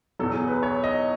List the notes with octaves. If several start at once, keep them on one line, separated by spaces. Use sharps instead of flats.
E2 B2 F#3 A4
G#4
B4
C#5
D#5